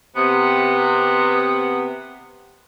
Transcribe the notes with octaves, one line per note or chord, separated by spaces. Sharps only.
C3 B3